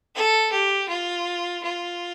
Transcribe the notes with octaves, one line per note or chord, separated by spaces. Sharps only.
A4
G4
F4
F4